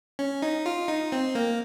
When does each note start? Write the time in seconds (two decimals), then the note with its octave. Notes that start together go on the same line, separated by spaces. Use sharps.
0.19 C#4
0.42 D#4
0.66 F4
0.88 D#4
1.12 C4
1.35 A#3